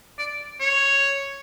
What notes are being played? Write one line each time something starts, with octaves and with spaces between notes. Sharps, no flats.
D5
C#5